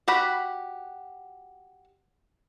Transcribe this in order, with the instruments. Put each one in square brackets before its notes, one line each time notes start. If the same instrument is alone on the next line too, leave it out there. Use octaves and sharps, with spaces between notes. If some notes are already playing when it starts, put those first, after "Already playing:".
[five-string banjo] F#4 G4 F#5 B5